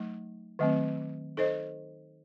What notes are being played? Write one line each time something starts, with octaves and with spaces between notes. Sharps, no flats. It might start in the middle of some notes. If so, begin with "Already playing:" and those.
Already playing: F#3 A3 D#4
D#3 F#3 A3 C4
D#4 A4 C5 D#5